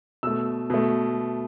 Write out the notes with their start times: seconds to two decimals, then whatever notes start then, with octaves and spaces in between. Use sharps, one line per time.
0.23 B2 A3 E6
0.70 B2 A3